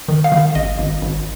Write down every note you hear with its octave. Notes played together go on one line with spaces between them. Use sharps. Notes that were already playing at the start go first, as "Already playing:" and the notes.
D#3
F5
D#3
G#1 D#5
G#1
G#1